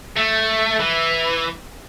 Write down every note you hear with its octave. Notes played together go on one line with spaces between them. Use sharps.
A3
E3